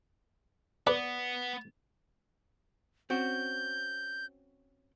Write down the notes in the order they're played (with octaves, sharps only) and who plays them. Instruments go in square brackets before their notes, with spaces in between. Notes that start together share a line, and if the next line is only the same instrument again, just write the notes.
[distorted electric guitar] B3 [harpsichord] B4 [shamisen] D5
[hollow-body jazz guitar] C4 C#4 F#4 [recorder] G6